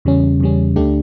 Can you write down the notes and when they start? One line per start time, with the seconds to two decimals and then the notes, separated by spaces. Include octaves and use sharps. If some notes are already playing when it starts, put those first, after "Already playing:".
0.05 E2 C#3 G3 C#4
0.40 E2 C#3 G3 C#4
0.76 D2 D3 A3 D4 G4